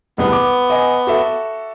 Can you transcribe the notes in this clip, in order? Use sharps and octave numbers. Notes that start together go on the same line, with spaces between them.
E1 C2 B3
D6
D#5 G#5
F#4 A4 E5